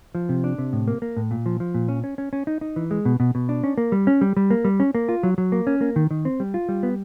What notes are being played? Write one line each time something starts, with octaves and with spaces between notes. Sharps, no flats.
F3
C3
D4
C3
A2
A#3
A#3
A2
A#2
F3
F3
A#2
C#4
C#4
C#4
C#4
D#4
D#4
E3
G#3
B2
B2
B2
D4
C#4
A#3
G3
C#4
G3
G3
A#3
G3
C#4
A#3
F4
F#3
F#3
A#3
C#4
A#3
D#3
D#3
C4
G3
F4
G3
B3